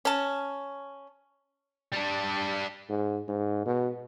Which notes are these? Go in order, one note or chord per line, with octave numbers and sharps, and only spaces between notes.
C#4 A5
G3 D4
G#2
G#2
B2